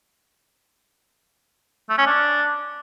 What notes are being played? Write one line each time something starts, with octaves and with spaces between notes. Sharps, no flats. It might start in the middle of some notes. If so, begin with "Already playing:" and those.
A3
C#4
D4